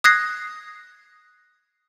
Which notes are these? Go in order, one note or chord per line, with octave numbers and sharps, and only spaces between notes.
D#6 F#6 G#6 A#6 C7